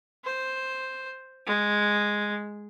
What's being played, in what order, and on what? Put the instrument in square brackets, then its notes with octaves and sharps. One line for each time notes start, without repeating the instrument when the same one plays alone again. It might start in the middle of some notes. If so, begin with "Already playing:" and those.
[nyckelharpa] C5
G#3